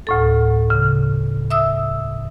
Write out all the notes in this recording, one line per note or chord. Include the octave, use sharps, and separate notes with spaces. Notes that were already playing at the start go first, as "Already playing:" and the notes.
D2 A2 A4
C#3
E5 D#6 E6